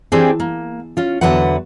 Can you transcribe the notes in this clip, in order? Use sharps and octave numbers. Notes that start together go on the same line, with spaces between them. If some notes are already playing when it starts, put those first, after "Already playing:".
E3 C4 D4 G4 G#4
A#3
C#4 F4
E2 D3 F#3 B4 E5 F#5